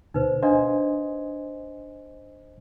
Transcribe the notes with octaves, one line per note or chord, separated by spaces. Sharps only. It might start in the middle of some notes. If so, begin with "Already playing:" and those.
D2 B2 D#4 B4 C5
D4 C5 D#5 F5 G#5